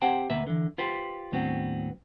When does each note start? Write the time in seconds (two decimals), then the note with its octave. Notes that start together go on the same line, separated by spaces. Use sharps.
0.02 C4 G4 C5 F#5 G5 A5
0.30 D2 B2 A#3 B4 E5
0.47 D3 E3
0.78 F4 G4 B4 C5
1.32 D#2 A2 F#3 B3 C4 D4